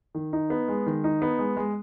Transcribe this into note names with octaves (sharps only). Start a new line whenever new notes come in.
D#3
D#4
B3
G#3
D#3
D#4
B3
G#3
G#3